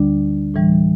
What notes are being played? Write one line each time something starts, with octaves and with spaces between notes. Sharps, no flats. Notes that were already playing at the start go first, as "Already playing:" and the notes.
Already playing: D2 D3 G3 D4
A2 E3 G3